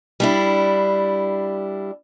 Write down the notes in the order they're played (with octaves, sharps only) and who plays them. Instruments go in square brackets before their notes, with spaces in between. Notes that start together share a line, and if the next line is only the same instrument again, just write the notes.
[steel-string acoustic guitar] G3 D4 E4